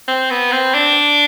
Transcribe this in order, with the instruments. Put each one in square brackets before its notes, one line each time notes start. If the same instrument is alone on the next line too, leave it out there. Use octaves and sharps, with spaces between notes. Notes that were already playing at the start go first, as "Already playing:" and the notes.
[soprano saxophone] C4
B3
C4
D4